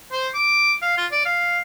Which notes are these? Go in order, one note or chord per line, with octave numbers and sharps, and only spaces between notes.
C5
D6
F5
F4
D5
F5